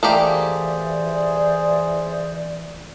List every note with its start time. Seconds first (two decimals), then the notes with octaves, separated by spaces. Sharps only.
0.03 E3 A3 A#3 G4 G#4 C5 D5